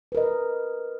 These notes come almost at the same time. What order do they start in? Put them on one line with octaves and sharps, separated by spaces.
B4 A#4 D#5